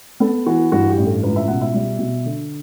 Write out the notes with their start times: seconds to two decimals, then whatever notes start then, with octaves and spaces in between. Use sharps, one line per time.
0.20 B3 A4
0.46 E3 F#4
0.72 G2 F#4
0.89 G4
0.98 A1
1.06 A4
1.23 C#2 B4
1.36 E5
1.48 B2 F#5
1.61 E5
1.74 G3
1.99 B2
2.26 D3